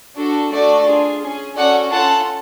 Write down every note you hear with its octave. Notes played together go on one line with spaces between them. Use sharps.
D4 F#4 A4
A3 D4 F#4 A4 D5
D4 F4 G#4
C#4 G#4
C#4 F#4 A4 D5 F#5
C#4 F4 A4 F#5 A5